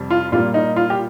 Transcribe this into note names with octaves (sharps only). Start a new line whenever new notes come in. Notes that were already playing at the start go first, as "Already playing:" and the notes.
Already playing: F2 C3 G3
F4
A#2 G3 A#3 F4
D#4
F4
G4